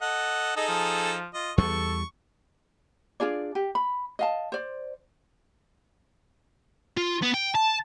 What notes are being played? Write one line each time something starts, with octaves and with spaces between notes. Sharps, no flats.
A4 D#5 F#5
D#4 G#4 A4 D#5
F3
F4 D#5
E2 G3 A4 C#6
D4 F4 G#4 D5
G4
B5
D#5 F5 A5
C5 D5
F4
B3
G5
A5